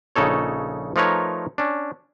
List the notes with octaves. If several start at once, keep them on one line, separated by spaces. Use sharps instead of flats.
A#1 C#3 D#4 A4 C#5
F3 A3 D#4 A#4 B4 C#5
C#4 D4